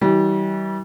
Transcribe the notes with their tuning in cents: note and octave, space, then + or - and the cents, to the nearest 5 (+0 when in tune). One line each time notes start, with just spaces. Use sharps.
E3 -40 G3 -30